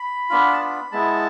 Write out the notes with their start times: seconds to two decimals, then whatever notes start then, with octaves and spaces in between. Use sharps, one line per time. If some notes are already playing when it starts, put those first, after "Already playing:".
Already playing: B5
0.30 B3 D4 F4
0.54 A5
0.61 B5
0.92 G#3 B3 E4 A5